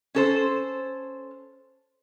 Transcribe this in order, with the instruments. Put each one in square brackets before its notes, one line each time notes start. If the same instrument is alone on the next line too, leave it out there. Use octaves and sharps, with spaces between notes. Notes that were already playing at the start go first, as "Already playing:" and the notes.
[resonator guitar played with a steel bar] C#4 A4 C5